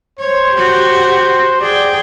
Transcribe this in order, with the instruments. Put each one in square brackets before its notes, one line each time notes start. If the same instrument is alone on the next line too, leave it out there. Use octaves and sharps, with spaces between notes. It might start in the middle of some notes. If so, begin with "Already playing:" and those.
[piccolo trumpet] C5 [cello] C#5
[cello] F#4 G4
[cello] G#4 G5 [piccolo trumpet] D5